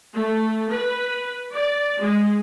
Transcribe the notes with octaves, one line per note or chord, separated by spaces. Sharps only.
A3
B4
D5
G#3